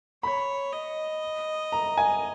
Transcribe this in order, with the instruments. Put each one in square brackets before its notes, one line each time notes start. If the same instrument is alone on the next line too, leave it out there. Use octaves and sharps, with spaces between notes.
[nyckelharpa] C#5 [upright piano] B5
[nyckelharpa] D#5
[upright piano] A#5
G#5